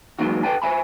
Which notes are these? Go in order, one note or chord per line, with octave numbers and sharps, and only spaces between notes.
E3 F#3 G#3 A#3 D#4 F#4
A4 B4 D5 F#5 G5 A5
C5 E5 G#5 B5